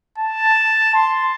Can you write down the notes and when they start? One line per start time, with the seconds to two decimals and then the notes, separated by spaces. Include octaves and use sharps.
0.18 A5
0.95 C6